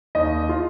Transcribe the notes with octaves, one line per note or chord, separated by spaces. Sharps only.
D#2 D#4 D#5
F4 F5